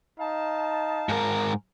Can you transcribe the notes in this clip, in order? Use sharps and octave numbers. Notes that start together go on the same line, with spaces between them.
D#4 F5 A5
G#2 A#4